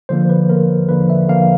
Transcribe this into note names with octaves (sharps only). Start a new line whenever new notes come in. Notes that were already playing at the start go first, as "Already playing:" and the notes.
D3 F3 A#3 C5
B4
D3 F3 A#3 A#4
D3 F3 A#3 B4
E5
D3 F3 A#3 F5